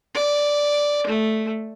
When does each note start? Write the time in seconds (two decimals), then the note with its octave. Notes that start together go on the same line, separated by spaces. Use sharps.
0.15 D5
1.07 A3